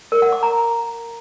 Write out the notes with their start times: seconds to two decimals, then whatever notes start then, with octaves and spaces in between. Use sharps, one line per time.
0.12 A#4
0.22 F#5
0.32 D6
0.43 A#5